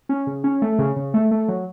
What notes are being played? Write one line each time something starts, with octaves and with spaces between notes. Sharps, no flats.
C#4
C#3
C#4
A3
C#3
C#3
A3
A3
F#3